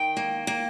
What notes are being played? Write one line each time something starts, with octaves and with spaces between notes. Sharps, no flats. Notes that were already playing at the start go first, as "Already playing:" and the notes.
Already playing: D#3 G5
A#3
A#3